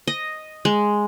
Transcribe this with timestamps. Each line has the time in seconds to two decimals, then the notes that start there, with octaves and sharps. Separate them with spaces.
0.07 D#5
0.65 G#3